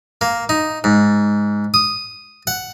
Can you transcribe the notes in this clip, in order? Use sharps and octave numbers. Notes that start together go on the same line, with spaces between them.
A#3
D#4
G#2
D#6
F#5